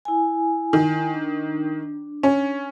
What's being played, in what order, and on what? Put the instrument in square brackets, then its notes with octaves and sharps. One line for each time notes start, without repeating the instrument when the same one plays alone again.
[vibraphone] E4 G#5
[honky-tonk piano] D#3
[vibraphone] D4
[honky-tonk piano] C#4